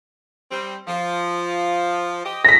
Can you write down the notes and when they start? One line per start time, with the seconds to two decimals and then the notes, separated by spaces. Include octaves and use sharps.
0.51 G3 C4
0.88 F3
2.25 G4 D#5
2.45 G#2 C#3 A#6 B6